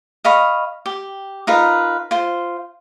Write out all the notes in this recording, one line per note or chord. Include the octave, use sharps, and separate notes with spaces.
D#5 F5 B5 C#6
G4
D#4 F4 A#4 B4
F4 C5